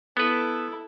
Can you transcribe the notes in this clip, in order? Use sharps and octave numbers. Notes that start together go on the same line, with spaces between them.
B3 E4 A4 B4